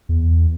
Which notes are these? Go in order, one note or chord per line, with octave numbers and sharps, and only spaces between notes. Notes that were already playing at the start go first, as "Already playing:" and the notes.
E2